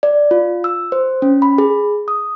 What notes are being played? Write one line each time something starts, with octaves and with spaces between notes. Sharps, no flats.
D5
F4
E6
C5
C#4
B5
G#4
D#6